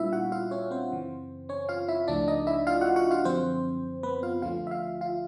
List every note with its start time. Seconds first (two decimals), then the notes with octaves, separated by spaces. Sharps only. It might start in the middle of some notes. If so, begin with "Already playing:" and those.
Already playing: A#2 G3 B3 D4 E4 F4 E5 F5
0.13 F#4 F#5
0.32 F4 F5
0.51 C#4 C#5
0.71 C4 C5
0.91 F#2 C#3 E3
1.49 C#4 C#5
1.69 F4 F5
1.89 E4 E5
2.08 C#2 C#3 F3 A3 D4 D5
2.27 D#4 D#5
2.47 E4 E5
2.67 F4 F5
2.81 F#4 F#5
2.96 F#4 F#5
3.11 F4 F5
3.25 F#2 D3 F3 C4 C5
4.03 B3 B4
4.23 F4 F5
4.42 D2 D3 F3 A3 C#4 F4 F5
4.67 E5
4.71 F4 F5
5.01 F4 F5